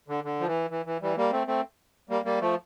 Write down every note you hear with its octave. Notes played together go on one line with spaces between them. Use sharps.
D3
D3
F3
E3
E3
E3
E3 G3
G3 A#3
A3 C4
A3 C4
G3 A#3
G3 A#3
F3 A3